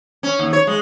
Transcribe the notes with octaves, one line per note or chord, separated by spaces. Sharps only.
C#4
D#2
C#5
G#3